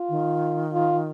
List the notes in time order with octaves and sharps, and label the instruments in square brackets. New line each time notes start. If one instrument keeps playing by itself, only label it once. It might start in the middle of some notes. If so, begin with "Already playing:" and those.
Already playing: [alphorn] F4
[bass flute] D#3
[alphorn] F4